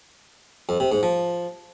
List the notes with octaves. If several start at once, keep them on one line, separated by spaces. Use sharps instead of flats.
F2
C3
G#2
F3